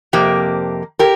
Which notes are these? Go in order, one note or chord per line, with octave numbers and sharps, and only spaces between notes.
F2 C3 A#3 G4
G4 A#4